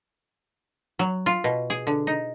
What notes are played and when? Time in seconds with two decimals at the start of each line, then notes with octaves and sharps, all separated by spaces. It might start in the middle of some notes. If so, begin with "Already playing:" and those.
0.99 F#3
1.26 F4
1.44 B2
1.70 G#4
1.87 D3
2.07 D#4